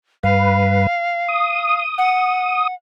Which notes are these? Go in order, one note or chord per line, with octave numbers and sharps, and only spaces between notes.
G2 B4 F5
D#6
F#5